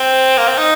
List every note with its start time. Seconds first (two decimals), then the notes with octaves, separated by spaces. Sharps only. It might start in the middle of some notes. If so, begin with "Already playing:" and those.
Already playing: C4
0.38 A#3
0.48 C4
0.58 D#4